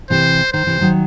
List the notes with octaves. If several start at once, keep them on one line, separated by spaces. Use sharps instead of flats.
C3 E3 C5
D#3 C5
C3 E3
D#3 F#3